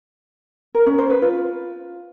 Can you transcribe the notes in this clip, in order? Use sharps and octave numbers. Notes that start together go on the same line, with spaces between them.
A#4
C#4
C5
B4
F4